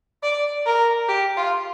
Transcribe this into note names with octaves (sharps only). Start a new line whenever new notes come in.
D5
A#4
G4
F4